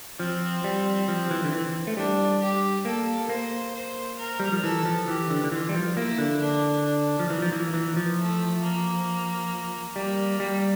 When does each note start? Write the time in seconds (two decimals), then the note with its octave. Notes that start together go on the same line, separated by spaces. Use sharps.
0.19 F3 C4
0.64 G3
1.08 F3
1.31 E3
1.44 D3
1.52 E3
1.87 A3
1.97 G3 D4
2.42 G4
2.85 A#3 A4
3.30 A#3 C5
3.75 C5
4.18 A#4
4.40 G3
4.52 F3
4.63 E3 A4
4.85 F3
5.08 E3 G4
5.30 D3
5.44 D3
5.52 E3 F4
5.69 G3
5.75 F3
5.96 A#3 E4
6.18 D3
6.40 D4
6.85 D4
7.19 F3
7.30 E3 A#3
7.42 F3
7.52 E3
7.74 E3
7.96 F3
8.18 A3
8.62 A#3
9.96 G3 A#3
10.40 G3